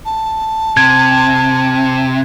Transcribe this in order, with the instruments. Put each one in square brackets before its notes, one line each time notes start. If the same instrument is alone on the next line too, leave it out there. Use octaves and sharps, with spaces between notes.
[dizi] A5
[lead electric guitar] C3 [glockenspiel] G#6